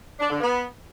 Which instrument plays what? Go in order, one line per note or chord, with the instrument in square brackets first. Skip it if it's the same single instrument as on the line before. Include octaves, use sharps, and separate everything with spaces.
[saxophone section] D4
D3
B3